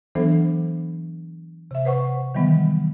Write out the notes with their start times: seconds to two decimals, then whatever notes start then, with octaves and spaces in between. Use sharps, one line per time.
0.15 E3 F#3 B3 D4 A4 C5
1.71 C3 E5
1.85 B4 C5 F#5 C#6
2.35 D#3 E3 F#3 G3 B3